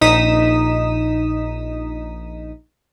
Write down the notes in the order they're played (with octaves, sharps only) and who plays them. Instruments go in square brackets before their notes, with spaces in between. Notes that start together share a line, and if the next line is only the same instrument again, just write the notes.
[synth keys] A#1 D#4 D#6 B6 E7